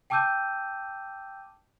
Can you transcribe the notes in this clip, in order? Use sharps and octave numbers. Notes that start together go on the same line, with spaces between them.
G5 A5 D6 E6 G6 D#7